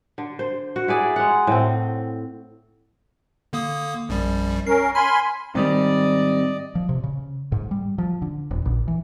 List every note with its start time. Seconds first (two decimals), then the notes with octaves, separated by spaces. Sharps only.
0.18 D3
0.39 C5
0.76 F#4
0.88 E4 G#4 D5
1.16 G#3 F#5
1.47 A2 C4
3.53 D3 A#3 D#6
4.09 A#1 F#2 G3
4.67 C#4 A#4 C7
4.95 G#5 B5 C6 F6
5.55 G#2 D#3 G3 C4 D5 D#5
6.75 F3
6.89 C3
7.04 C#3
7.52 G#2
7.71 G3
7.98 F3
8.22 D3
8.51 D#1
8.66 A#1
8.88 E3